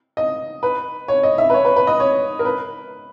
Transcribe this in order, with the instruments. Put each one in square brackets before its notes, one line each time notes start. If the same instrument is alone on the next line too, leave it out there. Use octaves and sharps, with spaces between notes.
[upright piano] D#5
B4
C#5
D#5
E5
B4
C#5
B4
B4
D#5
C#5
A#4
B4